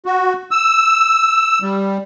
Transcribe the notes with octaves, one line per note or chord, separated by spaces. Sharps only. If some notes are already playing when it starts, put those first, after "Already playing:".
F#4
E6
G3